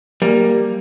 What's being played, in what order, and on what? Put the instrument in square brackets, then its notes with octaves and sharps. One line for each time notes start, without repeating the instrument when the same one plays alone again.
[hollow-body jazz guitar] G3 A#3